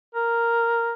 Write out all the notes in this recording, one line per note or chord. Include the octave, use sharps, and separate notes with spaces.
A#4